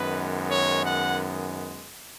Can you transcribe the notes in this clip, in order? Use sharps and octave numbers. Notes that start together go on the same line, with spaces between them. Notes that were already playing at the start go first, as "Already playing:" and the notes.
Already playing: F#2 D#3 G#3 B3 B4
C#5
F#5